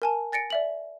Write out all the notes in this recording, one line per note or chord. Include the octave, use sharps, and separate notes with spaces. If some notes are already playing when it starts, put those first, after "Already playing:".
A#4 G#5 A5
G#5 A6 A#6 C#7 D7
D5 E5 F#7